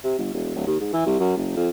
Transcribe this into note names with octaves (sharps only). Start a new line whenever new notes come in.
C3
G1
E1
D1
D#2
G#2
E3
C2
F#2
F#1
F2